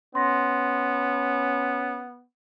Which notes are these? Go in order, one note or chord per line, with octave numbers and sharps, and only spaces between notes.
B3 C#4 C6 A#6